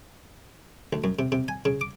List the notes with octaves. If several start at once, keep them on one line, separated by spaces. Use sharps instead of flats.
D2
F#2
C3
C3
G#5
C#3
D6